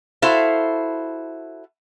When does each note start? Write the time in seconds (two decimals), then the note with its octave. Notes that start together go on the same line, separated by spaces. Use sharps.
0.22 E4 F#4 A4 C5 E5 F5